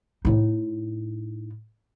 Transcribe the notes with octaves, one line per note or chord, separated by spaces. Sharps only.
A2 D#4